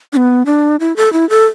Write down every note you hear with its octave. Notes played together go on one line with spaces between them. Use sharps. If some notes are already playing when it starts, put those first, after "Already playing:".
D4
B3
D4
E4
A4
E4
A4